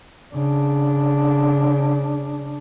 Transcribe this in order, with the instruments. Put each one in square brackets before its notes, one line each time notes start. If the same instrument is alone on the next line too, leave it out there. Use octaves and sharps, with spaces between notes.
[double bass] C#3 D4